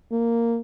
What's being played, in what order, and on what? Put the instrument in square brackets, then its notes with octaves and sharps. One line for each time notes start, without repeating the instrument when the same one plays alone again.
[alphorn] A#3